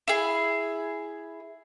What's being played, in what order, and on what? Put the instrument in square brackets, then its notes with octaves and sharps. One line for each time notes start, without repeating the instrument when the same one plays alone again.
[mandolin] E4 G#4